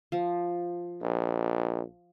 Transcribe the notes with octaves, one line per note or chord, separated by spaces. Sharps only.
F3
A#1